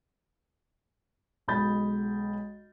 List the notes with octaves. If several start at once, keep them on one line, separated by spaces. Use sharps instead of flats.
B1 G#3 B5 G6 A6